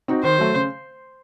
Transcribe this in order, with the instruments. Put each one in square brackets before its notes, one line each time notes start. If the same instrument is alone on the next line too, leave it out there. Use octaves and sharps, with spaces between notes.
[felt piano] C4 D#4 F#4
[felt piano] D#3 [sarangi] C5
[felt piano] F#3 A3
C#3